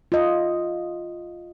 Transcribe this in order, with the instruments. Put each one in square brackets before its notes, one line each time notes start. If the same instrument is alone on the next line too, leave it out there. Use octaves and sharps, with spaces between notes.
[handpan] F4 D#5